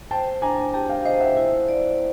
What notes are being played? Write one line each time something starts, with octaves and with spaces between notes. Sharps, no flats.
C5 G5 A5
D4 G#5 A#5
G4 G5 A5
F5 G5
C5 D#5 F5
E5 F#5
E4
D5